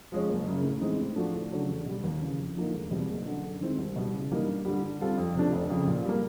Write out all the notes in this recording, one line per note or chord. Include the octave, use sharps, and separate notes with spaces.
F3 G#3 C#4
F#1
F#2 C#3
A2
E3 G#3 C4 D#4
A2
F3 A3 D4 F#4
D2
C#3 F#3 A3 D4
E2
B2 G3
D#2
C#3 E3
F2
D3 F3 A#3 D#4
E1
E2 B2 G3 C4
F#1
F#2 D3
F#2
D#3 G#3 C4 E4
C2
B2 G3
C#3
E3 G3 A#3 D#4
G2
D3 G3
D3
G3 C4 F4 A4
F2
C3 F3 A3 D4
F1
F2 C#3
A#2
G3 A#3